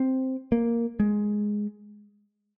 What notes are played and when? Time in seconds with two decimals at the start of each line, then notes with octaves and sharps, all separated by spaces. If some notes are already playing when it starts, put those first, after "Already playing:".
Already playing: C4
0.52 A#3
1.00 G#3